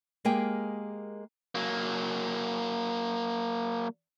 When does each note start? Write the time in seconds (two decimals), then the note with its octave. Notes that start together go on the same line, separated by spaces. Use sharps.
0.25 G#3 A#3 G4 G#4 A#4 G5
1.55 F#3 A#3